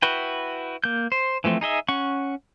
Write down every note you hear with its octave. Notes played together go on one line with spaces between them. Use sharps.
E4 F#4 B4 G5
A#3 G6
C5
E3 F3 A3 C4
D#4 G#4 D#5 E5
C#4 F#5 C#6